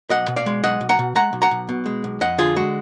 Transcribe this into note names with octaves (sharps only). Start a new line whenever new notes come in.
B1 D#5 F#5
B2
D5 F5
G#3
B1 D#5 F#5
B1
F#5 A#5
B2
G#3 F#5 A#5
B1
F#5 A#5
B1
B2
G#3
B1
F2 D#5 F#5
D3 F4 G#4
G#3 F#4